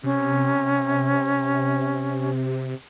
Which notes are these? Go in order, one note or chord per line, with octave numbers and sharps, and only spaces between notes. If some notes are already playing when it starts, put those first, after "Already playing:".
C3 C#4